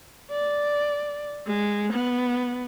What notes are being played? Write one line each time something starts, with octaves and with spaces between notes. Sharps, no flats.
D5
G#3
B3